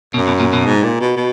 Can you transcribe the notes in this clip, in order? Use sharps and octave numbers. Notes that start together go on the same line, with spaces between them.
F#2 B2
B2
A#2
B2
G#2
A#2
B2
B2